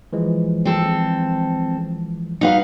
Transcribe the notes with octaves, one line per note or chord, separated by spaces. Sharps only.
E3 F3 G#3
C4 A4
G3 D#4 B4 F5 F#5 C#7